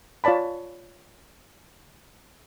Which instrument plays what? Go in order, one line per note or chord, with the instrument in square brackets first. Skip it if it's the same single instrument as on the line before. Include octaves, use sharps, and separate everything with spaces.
[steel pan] F4 C#5 D5 A5 B5